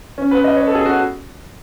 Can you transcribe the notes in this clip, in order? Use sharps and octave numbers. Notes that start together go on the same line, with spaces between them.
C#4
B4
D#5
C#5
A4
G#4
F#4